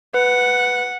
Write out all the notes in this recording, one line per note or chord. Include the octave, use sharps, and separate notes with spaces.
B4 F#5